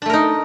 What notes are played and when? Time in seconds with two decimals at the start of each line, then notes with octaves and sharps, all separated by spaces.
0.02 D4
0.06 A3
0.10 A#4
0.13 D#4